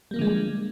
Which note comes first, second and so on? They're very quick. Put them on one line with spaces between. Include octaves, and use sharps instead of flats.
G3 A#3 F3 D3 G#3